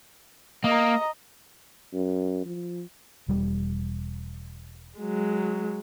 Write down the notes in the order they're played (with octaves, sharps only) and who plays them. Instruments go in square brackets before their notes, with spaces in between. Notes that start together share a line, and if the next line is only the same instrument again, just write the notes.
[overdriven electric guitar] A#3 [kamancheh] D#5 A#5
[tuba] F#2
F3
[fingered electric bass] E1 G3
[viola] F#3 G#3